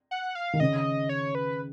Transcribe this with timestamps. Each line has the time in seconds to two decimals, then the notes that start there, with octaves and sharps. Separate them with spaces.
0.11 F#5
0.35 F5
0.53 D#3
0.60 C#3 D#5
1.09 C#5
1.35 B4